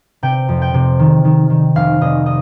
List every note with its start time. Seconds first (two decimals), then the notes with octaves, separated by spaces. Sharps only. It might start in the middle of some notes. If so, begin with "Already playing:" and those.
0.23 C3 G5
0.49 F2
0.62 G5
0.74 C3
0.99 D#3
1.25 D#3
1.50 D#3
1.75 F1 F5
2.01 F1 D#5
2.26 D#5